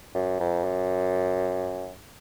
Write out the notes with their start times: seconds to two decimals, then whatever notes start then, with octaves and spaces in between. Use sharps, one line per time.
0.15 F#2
0.40 F2
0.64 F#2